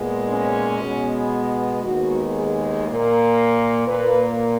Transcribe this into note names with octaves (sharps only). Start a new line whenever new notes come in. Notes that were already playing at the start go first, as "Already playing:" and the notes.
Already playing: A#2 G#3 B3
C#4
B2 G#3 B3
D#2 D#3 G#3 B3 F#4
G#4
A#2 A#3 A#4
A#2 A#3 B4